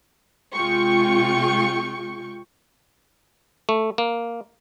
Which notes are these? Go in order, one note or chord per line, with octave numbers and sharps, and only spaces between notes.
C3 G#3 F4 G5 C#6
A3
A#3